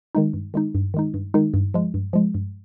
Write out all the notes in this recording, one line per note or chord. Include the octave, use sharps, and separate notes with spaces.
D#3 G#3 D#4
G2
D#3 G#3 D#4
G2
D#3 G#3 D#4
G2
D#3 G#3 D#4
G2
F3 G#3
G2
F3 G#3
G2